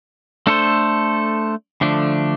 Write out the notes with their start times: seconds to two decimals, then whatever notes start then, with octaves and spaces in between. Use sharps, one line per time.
0.47 A3 D4 A4 C5
1.81 D3 F3 A3 D4